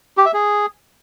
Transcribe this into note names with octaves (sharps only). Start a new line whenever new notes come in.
G4
E5
G#4